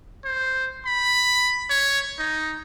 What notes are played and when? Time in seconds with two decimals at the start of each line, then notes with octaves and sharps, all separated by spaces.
0.25 C5
0.86 B5
1.70 C#5
2.19 D#4